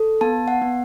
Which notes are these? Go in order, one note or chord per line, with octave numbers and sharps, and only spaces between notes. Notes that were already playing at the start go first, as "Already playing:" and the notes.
Already playing: A4
B3 A5
F#5
B3